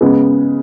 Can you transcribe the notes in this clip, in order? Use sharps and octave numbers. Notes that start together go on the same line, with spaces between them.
C#3 G#3 B3